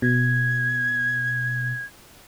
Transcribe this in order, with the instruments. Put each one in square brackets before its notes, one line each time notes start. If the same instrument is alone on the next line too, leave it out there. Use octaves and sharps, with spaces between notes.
[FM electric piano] B2 [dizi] G#6